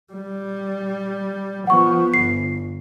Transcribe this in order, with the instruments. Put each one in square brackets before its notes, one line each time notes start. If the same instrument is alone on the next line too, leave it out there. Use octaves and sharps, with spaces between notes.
[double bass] G3
[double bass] F3 B3 [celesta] F#5 C#6
[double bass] G1 [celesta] C7